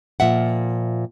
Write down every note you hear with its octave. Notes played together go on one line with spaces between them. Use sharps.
A#2 F3 E5 F#5